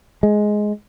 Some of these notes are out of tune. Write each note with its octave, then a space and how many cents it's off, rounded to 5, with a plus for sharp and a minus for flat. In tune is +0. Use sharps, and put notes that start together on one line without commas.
G#3 +10